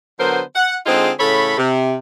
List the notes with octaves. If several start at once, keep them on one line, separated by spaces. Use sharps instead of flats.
D3 F#3 B3 A#4 C5
F#5
D3 G#3 C4 D#4 F4 G#4
A2 C#3 A4 C#5 B5
C3